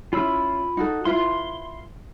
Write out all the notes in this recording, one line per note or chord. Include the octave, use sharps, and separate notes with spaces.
C#4 E4 F4 B5 E6
D#4 F#4 A4
E4 F4 B4 C6